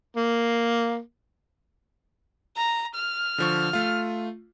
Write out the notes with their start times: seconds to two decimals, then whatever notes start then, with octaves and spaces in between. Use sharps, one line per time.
0.17 A#3
2.57 A#5
2.95 F6
3.38 D3 F3 C#6
3.73 A3 F4